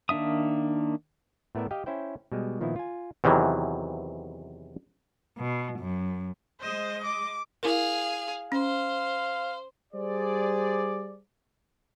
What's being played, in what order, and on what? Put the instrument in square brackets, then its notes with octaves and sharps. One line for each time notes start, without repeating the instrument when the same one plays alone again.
[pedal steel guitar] D#3 A#3 D4 E5 D#6
[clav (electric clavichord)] A2 A3 B3 A#4 D5 E5
G4 D#5 F5 G5
C#4 E4 C5 G5
B2 G3 G#3
A#2 D#3 F3 B3 E4
F4 G#5
E2 C3 D#3 E3 F#3
[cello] B2
F#2
[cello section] G#3 D#5 [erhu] C5
[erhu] D6
[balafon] E4 A#4 [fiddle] G#4 F5
[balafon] C#4 [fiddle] C5 [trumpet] F5
[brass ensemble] G3 G#4 C5 D5